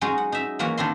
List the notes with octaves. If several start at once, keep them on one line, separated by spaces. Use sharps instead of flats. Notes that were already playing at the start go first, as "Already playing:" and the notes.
F#3 G#3 C#4 D#4
F#5
D#4 E5
E3 F#3 A#3 F#4 C#5
D#3 D4 E4 C6